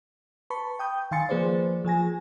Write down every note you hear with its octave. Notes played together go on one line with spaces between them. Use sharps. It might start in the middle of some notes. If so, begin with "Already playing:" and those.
B4 A5 B5 C#6
G5 D#6 G6
D#3 F5 G#5 C6 A6 C#7
F3 A#3 G#4 B4 C5 D5
F3 G#4 G#5 A#6